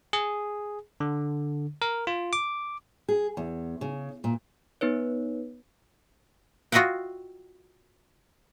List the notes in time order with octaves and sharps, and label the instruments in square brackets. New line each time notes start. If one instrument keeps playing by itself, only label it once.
[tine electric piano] G#4
D3
A#4
F4
D6
[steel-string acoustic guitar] G#4
E2
C#3
A#2
[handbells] B3 D#4 B4 C#5
[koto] F4 F#4 D#5 E5 F#5 G5